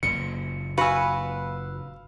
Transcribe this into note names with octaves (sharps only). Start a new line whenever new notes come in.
F#1 A#2 C#7
F#4 B4 F5 G#5 E6